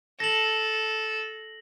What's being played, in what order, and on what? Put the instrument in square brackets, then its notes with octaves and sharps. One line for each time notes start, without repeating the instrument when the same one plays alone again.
[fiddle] A4 [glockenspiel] A#6 F#7